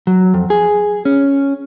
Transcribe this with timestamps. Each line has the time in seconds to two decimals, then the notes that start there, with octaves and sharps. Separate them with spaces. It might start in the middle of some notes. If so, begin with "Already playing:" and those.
0.07 F#3
0.34 F2
0.50 G#4
1.05 C#4